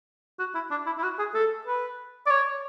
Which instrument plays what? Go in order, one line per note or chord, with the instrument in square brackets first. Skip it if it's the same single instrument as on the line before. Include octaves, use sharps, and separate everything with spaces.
[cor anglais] F#4
E4
D4
E4
E4
F#4
G#4
A4
B4
D5
C#5